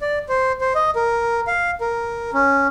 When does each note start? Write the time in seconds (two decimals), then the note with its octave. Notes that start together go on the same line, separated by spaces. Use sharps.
0.01 D5
0.29 C5
0.61 C5
0.75 D#5
0.95 A#4
1.47 F5
1.81 A#4
2.33 C#4